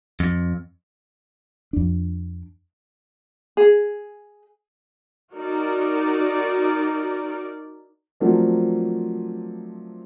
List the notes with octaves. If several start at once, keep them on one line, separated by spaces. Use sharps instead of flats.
F2
F2 D4
G#4
D#4 F#4 A#4 D5
F3 F#3 A3 A#3 C4 D4